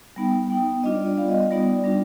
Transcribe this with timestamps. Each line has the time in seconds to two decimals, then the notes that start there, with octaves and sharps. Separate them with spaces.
0.16 G3 B3 D#4 G5
0.50 B3 D#4 G5
0.84 G3 D4 F4 D#5
0.95 D5
1.07 D5
1.18 G3 B3 F4 F5
1.28 D#5
1.40 D#5
1.50 G3 B3 D#4 D5
1.84 G3 D4 F4